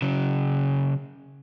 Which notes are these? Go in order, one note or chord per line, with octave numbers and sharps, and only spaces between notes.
C#3 F#3